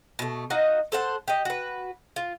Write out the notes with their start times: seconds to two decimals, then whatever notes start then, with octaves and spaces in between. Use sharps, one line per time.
0.19 B2 A3
0.50 D#4 F#4 D#5 F5
0.92 A4 C5 F#5
1.28 G4 D#5
1.45 F#4 B4
2.16 F4